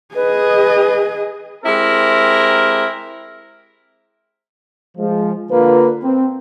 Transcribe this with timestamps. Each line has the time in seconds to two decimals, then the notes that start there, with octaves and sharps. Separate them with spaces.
0.15 G#4 B4 D#5
1.65 G#3 C4 E4 G4 A#4
4.98 F3 G#3
5.51 D3 A#3 F4 A#4 B4
6.04 C4